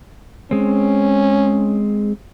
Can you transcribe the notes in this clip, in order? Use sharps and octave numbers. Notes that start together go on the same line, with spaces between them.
G#3 C4 C#4